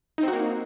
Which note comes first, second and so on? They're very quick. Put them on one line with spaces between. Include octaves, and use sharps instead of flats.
D#4 C4 F#4 A#3